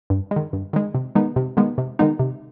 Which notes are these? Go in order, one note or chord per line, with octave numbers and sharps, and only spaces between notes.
G2
G#3
D#3
G2
D#3 G#3
C3
D#3 G#3 B3 D#4
C3
D#3 G#3 B3 D#4
C3
D#3 G#3 B3 D#4
C3